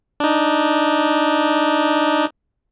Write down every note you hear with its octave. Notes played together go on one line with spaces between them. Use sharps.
D4 D#4